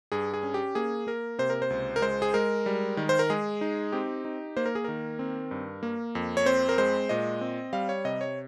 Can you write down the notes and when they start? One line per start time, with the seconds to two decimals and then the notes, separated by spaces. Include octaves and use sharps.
0.12 G2 G#4
0.34 G#4
0.43 C#4
0.54 G4
0.75 A#3 G#4
1.07 A#3 A#4
1.39 C3 C5
1.50 A#4
1.62 C5
1.70 C#2
1.96 A#4
2.02 G#3 C5
2.22 G#4
2.34 G#3 A#4
2.66 G3
2.97 D#3
3.09 C5
3.19 A#4
3.30 G#3 G#4
3.61 D#4
3.92 C4 G4
4.25 D#4
4.57 A#3 C5
4.66 A#4
4.75 G#4
4.84 D#3 A#4
5.19 C4
5.51 G2
5.83 A#3
6.15 F2
6.37 C#5
6.46 C4 C5
6.69 A#4
6.78 G#3 C5
7.09 A#2 D#5
7.41 C4
7.73 G3 F5
7.89 C#5
8.05 C3 D#5
8.21 C#5